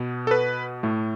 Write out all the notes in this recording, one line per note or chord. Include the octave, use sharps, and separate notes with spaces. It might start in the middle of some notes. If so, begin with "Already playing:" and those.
Already playing: B2 B3
A4
B4
A2 A3